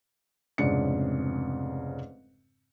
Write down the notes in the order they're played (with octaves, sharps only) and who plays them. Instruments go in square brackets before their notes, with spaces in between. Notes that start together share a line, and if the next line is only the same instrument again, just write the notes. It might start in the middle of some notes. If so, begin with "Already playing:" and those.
[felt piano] F1 F2 G#2 C#3 D4 C#7